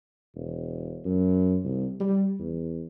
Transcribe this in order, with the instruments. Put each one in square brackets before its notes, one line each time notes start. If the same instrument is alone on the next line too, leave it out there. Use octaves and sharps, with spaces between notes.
[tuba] E1
F#2
C2
G3
E2